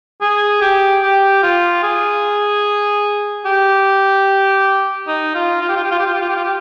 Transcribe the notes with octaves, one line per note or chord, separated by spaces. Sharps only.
G#4
G4
G4
F4
G#4
G4
D#4
F4
F4
G4
F4
G4
F4
G4
F4
G4
F4
G4
F4
G4